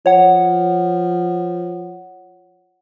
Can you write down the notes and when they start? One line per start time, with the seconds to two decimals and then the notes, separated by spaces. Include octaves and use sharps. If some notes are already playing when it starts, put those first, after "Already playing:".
0.06 F3 C#5 F#5